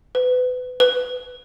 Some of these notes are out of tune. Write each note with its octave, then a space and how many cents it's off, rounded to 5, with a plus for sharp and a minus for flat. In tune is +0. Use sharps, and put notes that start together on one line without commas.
B4 +30
B4 +15